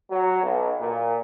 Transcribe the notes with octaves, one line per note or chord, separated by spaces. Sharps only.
F#3
B1
A#2